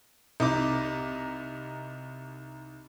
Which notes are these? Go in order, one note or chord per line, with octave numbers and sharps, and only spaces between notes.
C2 D#4 D6